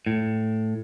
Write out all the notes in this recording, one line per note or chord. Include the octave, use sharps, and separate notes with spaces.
A2